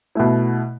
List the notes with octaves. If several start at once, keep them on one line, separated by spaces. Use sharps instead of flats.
B2 A3 E4